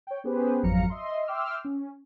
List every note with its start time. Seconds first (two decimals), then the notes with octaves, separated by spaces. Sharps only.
0.07 C#5 G5
0.24 B3 C#4 G4 G#4 B4 C5
0.63 G#1 F2 F#3 F5 A#5 C#7
0.90 D#5 E5 C6
1.27 E5 G5 C6 D6 E6 F6
1.64 C#4